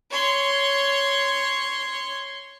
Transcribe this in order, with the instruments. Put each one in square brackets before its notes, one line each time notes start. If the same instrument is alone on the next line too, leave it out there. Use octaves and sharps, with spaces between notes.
[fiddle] C#5 C6